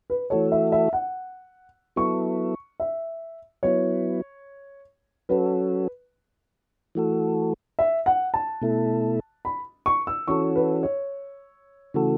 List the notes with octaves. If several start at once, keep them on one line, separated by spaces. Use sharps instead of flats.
B4
E3 A3 F#4 A4 C#5
E5
E5
F#5
F#3 B3 E4 A4 C#6
E5
F#3 B3 E4 C#5
F#3 C#4 F#4 A4 B4
E3 A3 F#4 A4
E5
F#5
A5
B2 A3 E4 A4
B5
C#6
E6
E3 C#4 F#4 A4 C#6
B4
C#5
C#3 E3 A3 F#4 A4